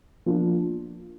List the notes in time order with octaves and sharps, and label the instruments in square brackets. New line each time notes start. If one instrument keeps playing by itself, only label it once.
[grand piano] F3 A#3 D4 F4